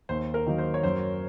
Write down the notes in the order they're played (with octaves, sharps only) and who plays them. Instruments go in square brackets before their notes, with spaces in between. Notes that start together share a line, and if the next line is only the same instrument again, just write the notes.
[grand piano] D#2 [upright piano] C5
[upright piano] A#4
[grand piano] D#3 F#3 A#3 D#4
[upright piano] C5
C#5
[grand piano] F#2 [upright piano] C5